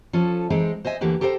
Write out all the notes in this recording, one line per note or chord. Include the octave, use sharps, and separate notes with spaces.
F3 C#4 A4
E3 G#3 C4 D#4
C5 D#5 E5 G#5
D2 D3 E3 A#3 G4 B4
G4 A4 A#4 C5 F5 G5